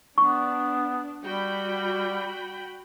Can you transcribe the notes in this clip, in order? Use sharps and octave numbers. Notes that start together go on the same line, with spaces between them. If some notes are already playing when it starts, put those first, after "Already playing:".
B3 D4 C#6
G3 F#4 G5 B5